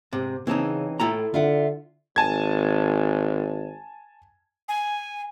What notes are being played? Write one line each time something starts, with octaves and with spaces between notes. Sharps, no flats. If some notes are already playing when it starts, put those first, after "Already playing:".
G#2 C3
C#3 E3 C4 D#4 C#5 A5
A2 E4 F4 A4 G5 A#5
D3 F4 E5 F#5
G#1 G#5 A5 G#6
G#5